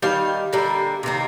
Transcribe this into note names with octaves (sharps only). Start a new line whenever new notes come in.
D#3 G3 F5
D3 G3 A#3
C3 D#3 A#3